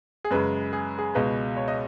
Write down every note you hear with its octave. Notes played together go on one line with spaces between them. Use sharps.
G#4
F#2 C#3 G#3 B4
G#4
G#4
C#2 B2 G#3 B4
C#5
D#5